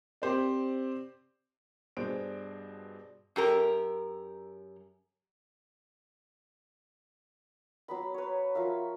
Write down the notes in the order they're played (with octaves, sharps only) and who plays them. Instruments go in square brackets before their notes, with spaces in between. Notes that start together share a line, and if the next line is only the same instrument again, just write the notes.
[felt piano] C4 G4 C5 D5
[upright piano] G2 B2 D4 G#4 C5 D7
[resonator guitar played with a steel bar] F#2 G4 A#4
[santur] F#3 B3 B5
B4 C#5
F3 A#4 E5 F5